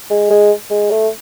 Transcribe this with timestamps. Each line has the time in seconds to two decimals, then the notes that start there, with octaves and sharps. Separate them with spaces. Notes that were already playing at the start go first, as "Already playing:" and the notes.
0.10 G#3
0.30 G#3
0.71 G#3
0.91 A3